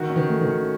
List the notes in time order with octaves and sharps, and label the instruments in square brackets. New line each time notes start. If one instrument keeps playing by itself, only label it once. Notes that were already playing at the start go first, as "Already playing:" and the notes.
Already playing: [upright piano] D#3 [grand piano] F#4
[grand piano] C#4
[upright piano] D#3
[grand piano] A3
[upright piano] D#3
[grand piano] C#4